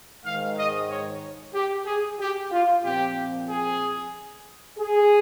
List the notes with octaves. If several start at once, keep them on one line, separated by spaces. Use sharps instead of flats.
G#2 D#3 G#3 F5
D#5
C#5
G4
G#4
G4
F4
A#2 F3 C4 G4
G#4
G#4